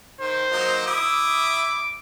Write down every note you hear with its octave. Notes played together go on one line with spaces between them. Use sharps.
D#3 C5
F#3 A#3 D#4
E4 E5 D6 D#6